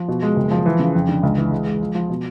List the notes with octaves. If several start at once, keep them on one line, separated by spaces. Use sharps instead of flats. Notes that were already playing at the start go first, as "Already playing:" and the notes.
Already playing: F3
B2
G#3
F#1
F3
E3
C#3
F2
D3
C#2
E3
G#3
G#3
F3
F3
B2